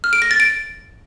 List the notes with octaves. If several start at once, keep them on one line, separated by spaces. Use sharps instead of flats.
F6
D7
A#6
A6
D7